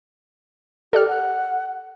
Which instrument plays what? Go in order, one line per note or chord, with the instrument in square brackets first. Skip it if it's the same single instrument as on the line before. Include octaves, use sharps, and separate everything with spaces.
[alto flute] G4 [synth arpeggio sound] A4 D5 F6
[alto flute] F#5